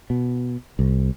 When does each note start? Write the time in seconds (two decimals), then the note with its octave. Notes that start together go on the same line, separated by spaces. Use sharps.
0.10 B2
0.79 C2